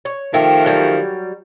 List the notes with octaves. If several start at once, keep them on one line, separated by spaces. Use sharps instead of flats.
C#5
D#3 F3 A3 G4 E5
F#3 G3